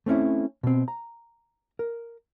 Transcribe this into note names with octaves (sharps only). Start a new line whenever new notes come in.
A3 C4 C#4 E4
B2 C4
A#5
A#4